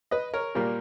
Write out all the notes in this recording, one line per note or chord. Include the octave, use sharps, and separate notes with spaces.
B4 D#5
A#4 C#5
A#2 G3 A#3